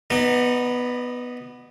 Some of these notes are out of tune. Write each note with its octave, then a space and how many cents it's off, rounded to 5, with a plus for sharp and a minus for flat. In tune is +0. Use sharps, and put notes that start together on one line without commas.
B3 +0 D#4 +0 D5 +40